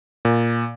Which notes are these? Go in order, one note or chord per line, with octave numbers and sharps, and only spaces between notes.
A#2